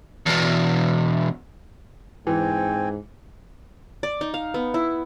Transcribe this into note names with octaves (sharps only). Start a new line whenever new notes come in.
E2 B2
G#2 E3 C4 G5 G#5
D5
D#4
F5
B3
E4